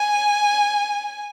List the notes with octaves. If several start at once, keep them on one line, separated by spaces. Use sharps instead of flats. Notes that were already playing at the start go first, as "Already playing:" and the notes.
Already playing: G#5